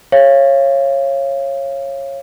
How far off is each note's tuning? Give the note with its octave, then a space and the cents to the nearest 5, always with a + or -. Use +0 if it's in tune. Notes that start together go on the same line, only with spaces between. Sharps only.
C#5 -15 F5 -30